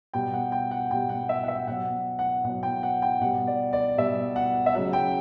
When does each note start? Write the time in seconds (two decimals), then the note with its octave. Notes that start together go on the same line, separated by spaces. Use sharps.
0.14 B2 G3 G5
0.33 F#5
0.52 G5
0.71 F#5
0.91 B2 G3 G5
1.09 F#5
1.29 E5
1.44 F#5
1.48 E5
1.67 B2 F#3 F#5
2.19 F#5
2.44 B2 F#3 F#5
2.63 G5
2.83 F#5
3.02 G5
3.21 B2 G3 F#5
3.47 D5
3.73 D5
3.98 B2 G3 E5
4.36 F#5
4.66 E5
4.74 C#3 F#3 F#5
4.93 G5